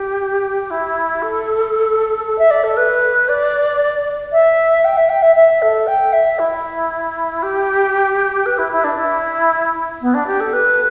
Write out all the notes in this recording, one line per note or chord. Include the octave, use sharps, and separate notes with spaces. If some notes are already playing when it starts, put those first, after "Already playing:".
Already playing: G4
E4
A4
A4
E5
D5
A4
B4
D5
E5
G5
E5
G5
E5
E5
A4
G5
E5
E4
G4
B4
E4
E4
D4
E4
B3
D4
G4
A4
B4